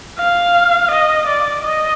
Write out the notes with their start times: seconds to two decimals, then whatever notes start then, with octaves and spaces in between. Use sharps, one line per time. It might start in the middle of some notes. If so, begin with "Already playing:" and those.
0.19 F5
0.91 D#5
1.27 D5
1.64 D#5